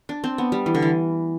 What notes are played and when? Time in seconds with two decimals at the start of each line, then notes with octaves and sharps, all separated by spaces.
0.09 D4
0.24 C4
0.38 B3
0.52 G3
0.66 E3
0.75 D3
0.82 E3